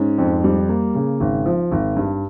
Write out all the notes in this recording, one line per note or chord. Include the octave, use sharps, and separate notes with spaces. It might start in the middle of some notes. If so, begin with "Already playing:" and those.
Already playing: G#2 C#4
F2
G3
A#3
C#3
G#1
F3
G#1
G2